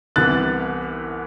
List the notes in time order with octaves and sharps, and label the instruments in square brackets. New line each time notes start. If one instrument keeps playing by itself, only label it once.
[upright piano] C2 C3 E3 B3 F#6 A6